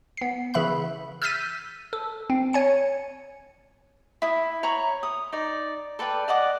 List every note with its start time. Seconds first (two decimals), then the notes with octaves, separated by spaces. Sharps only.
0.17 B3 C7
0.54 C#3 E3 E5 B5 F#6
1.22 E6 F6 G6 A6 B6 D#7
1.93 A4
2.30 C4
2.53 C#5 G#5 C#7
4.22 E4 D#6
4.63 C#5 A#5 B5 C#6
5.03 D#6
5.33 D#4 D5
5.99 A4 B4 D5 G5
6.28 D5 D#5 F#5 D6